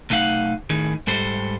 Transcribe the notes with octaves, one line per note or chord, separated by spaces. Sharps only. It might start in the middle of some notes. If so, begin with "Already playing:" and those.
B1 A3 D#4 F5 F#5
A2 D#3 D#4 G#4
G#2 G3 A4 C5